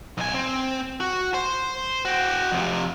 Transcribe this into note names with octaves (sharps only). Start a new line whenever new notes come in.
B1 G#5
C4
F#4
C5
F#4 G5
F2 C3